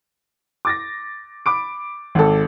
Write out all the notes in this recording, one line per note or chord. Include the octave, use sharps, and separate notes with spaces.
D6 A6 A#6
B5 D6 D7
G#1 A4